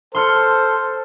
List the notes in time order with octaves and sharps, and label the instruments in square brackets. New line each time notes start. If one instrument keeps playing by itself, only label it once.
[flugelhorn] A4 [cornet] C5 [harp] C6 F6 C#7